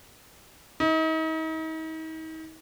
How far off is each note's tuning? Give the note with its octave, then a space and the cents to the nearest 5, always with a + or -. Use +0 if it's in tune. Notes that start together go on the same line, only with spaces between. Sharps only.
D#4 +40